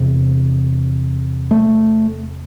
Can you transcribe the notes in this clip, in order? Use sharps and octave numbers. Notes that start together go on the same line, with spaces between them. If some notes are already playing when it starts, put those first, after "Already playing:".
Already playing: E2 C3
A3